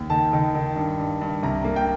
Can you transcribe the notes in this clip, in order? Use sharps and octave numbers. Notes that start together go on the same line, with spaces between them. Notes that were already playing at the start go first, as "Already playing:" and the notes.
Already playing: D#2
D#3 A5
D#3
D#3
G2
G2
G2
C2 A#5
A#3
G5